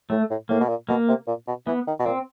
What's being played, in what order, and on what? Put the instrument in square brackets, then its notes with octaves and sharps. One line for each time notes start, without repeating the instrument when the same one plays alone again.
[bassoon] A2 [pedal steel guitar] A3
[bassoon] A2
[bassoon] A2 [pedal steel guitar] A#3
[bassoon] B2
A#2
[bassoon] B2 [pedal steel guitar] A#3
[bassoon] C3
A#2
B2
[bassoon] E3 [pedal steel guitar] B3
[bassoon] D#3
B2
[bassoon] A#2 [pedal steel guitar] C4